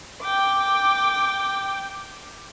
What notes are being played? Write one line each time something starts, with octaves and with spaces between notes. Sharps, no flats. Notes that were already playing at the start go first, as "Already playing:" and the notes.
G5 D6